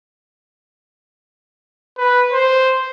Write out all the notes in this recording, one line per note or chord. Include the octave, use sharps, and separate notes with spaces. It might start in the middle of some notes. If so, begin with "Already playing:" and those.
B4
C5